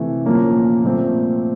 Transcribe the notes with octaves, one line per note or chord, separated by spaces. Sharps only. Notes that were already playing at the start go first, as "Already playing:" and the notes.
Already playing: C3 E3 A3
A#2 F3 A#3 C#4
A#2 F3 A3 C4